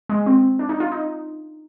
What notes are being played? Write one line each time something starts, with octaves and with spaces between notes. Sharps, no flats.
G#3
C4
D4
D#4
F4
D#4